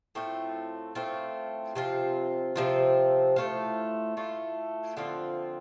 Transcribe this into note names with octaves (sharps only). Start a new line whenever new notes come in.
A2 A3 C4 F4
A2 A3 C4 F4
C3 F3 C4 F4
C3 F3 C4 F4
A2 A3 F4
A2 A3 F4
D3 F3 C4 F4